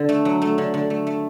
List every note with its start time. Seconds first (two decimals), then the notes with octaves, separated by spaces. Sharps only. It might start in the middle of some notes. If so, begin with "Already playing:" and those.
Already playing: D3
0.09 A3
0.25 F#3
0.42 A3
0.58 D3
0.74 D3
0.90 A3
1.07 A3